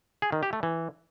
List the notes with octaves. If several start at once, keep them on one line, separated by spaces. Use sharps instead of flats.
G#4
D#3
G4
A3
E3